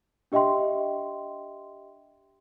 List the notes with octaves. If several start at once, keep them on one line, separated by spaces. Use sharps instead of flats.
D4 G4 D#5 E5 G5 C6